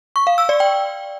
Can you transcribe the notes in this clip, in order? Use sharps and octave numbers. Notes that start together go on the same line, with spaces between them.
C#6
F5
E6
D5
G5